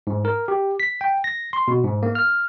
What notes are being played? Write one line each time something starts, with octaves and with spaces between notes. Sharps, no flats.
G#2
A#4
G4
B6
G5
A#6
C6
B2
G#2
A#3
F6